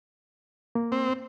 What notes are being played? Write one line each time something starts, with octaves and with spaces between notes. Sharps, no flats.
A#3
C4